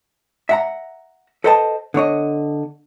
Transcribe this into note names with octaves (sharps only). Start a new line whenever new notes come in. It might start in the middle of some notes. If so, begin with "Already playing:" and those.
E5 F#5 A#5
A4 B4 C5 D#5 G5 A5
D3 B3 C#5 D#5